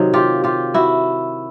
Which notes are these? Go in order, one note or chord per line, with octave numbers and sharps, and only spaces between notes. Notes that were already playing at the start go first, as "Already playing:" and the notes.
Already playing: C3 D#3 F#3
F4 G4
F4 G4
E4 F#4